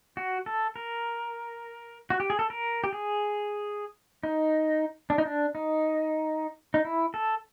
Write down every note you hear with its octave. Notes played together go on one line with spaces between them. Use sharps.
F#4
A4
A#4
F#4
G4
G#4
A4
A#4
G4
G#4
D#4
D4
D#4
D4
D#4
D#4
E4
A4